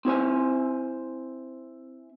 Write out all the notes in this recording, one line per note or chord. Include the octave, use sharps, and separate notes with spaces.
C4 E4 C5 G#5